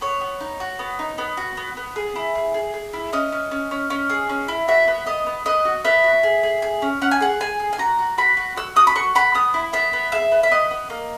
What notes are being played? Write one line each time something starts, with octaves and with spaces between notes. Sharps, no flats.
B3 C#5
B3
D#4
F#4
B3
D#4
B3
F#4
B3
B3
G#4
E4
G#4
G#4
G#4
E4
C#4 D#5
C#4
C#4
C#4
C#4
G#4
C#4
E4
F#4 E5
B3
B3 D#5
B3
B3 D#5
F#4
B3 E5
F#4
G#4
G#4
G#4
C#4
C#4 F#5
G#5
G#4 F#5
G#4 G#5
G#4
G#5
F#4 A#5
F#4
F#4 B5
F#4
F#4 E6
F#4 D#6
B5
F#4 C#6
F#4 B5
B3 D#6
E4
B3 E5
B3
G#4 E5
B3
E5
B3 D#5
B3
A#3